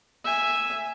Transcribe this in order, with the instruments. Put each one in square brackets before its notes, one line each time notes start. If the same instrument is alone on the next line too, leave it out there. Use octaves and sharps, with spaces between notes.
[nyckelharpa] E5 G#5